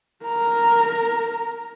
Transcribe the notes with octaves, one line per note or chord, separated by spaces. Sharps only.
A#4 A#5